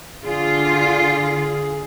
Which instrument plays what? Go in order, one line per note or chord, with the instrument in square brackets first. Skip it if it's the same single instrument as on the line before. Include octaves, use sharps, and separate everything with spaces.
[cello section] D3 F4 [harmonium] G#4